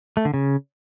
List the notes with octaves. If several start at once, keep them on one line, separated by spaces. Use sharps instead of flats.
A3
D3
C#3